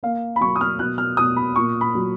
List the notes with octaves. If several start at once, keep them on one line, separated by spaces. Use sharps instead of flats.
A#3 F5
B5
F#3 C#6
D#6
F6
B2 F#6
F6
B2 D#6
B5
A#2 C#6
B5
F#3